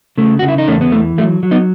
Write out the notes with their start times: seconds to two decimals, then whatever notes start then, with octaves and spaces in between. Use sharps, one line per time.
0.17 C#3 A3
0.39 C#3 F#4
0.48 E4
0.58 D#4
0.67 E2 A3 C#4
0.81 B3
0.92 E3 A3
1.18 F#3 A3
1.43 F#3
1.51 B3 D#4